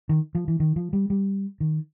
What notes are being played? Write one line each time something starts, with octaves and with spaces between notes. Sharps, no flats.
D#3
F3
E3
D#3
F3
G3
G3
D#3